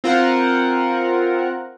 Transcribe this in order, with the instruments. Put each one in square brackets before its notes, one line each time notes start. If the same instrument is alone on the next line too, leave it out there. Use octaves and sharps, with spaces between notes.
[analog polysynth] C4 F4 A#4 C5 F#5